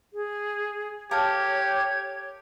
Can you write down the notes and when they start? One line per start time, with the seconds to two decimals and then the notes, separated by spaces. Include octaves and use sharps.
0.13 G#4
1.11 G4 A4 A#4 C#5 F5 G#6